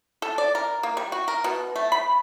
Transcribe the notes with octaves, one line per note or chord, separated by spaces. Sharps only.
A4
D5
A#4
A#3
G3
F#4
A#4
B2
A3
B5